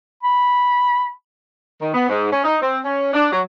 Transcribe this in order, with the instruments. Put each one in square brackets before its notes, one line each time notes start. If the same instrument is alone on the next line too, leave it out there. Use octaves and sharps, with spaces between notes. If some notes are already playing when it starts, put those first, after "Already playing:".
[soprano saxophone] B5
[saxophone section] D#3
B3
G#2
C#4
D#4
C4
C#4
D4
F#3